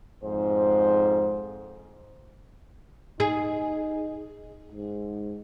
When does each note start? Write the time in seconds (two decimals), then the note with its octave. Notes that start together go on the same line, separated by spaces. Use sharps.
0.23 F2 G#2 C5
3.20 D#4 G#4
4.72 G#2